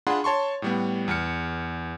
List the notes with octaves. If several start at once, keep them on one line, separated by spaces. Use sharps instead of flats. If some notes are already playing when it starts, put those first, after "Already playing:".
D4 F4 G#4 F#5 B5 C6
C#5 A5 C6 C#6
A2 G3 B3
E2 F6 C#7